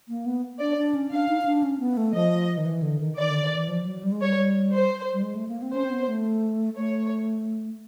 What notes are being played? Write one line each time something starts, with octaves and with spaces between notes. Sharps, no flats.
A#3
B3
D4 D5
D4
C#4
D4 F5
D#4
D#4
D4
C#4
B3
A3
F3 D#5
D#3
E3
D3
D#3
D#3 D5
D3
D#3
E3
F3
F#3
G3
G#3
G3 C#5
C5
G3
G#3
A3
A#3
C4
C#4 C5
C4
B3
A3
A3 C#5